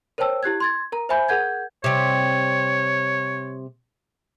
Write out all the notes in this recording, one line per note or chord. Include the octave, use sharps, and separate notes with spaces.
A#4 C5 C#5 G5 A5 E6
E4 G4 F#6 G#6
C6 G#6 A6
A#4 A#5
C5 E5 G#5 B5 G6
G#4 A#4 F#5 G6 G#6
C3 G3 C#5